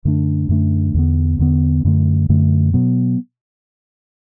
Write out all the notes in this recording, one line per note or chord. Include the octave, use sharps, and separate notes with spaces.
F#2 D3 A3 D4
F#2 D3 A3 D4
E2 D3 B3
E2 D3 B3
F#2 D3 A3
F#2 D3 A3
B2 F#3 B3